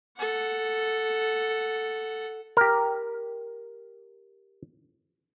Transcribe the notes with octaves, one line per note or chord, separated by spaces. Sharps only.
A4 F#5
G4 A#4